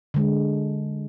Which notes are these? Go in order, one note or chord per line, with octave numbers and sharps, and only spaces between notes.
D3 G#3